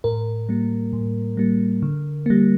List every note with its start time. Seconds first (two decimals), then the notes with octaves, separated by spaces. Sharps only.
0.04 A2 A#4
0.49 G3 A#3
0.93 A2
1.37 G3 A#3
1.82 D3
2.26 G3 A#3